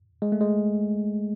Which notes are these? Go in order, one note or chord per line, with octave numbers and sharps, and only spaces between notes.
G#3
A3
G#3